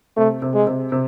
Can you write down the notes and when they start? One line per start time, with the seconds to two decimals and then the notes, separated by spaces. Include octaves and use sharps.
0.17 C3 A3
0.42 C3
0.54 G#3
0.67 C3
0.92 C3